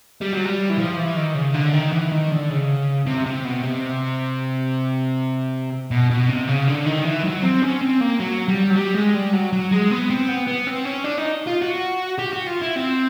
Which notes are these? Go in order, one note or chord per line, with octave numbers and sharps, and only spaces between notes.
G3
F#3
G3
E3
F3
E3
D#3
C#3
D3
D#3
E3
D#3
D3
C#3
C3
C3
B2
C3
B2
B2
C3
C#3
D3
D#3
E3
F#3
C4
C#4
C4
A#3
F#3
G3
F#3
G3
G#3
G3
F#3
F#3
G#3
B3
C4
B3
B3
C4
C#4
D4
D#4
F4
F#4
G4
F#4
F4
E4
C4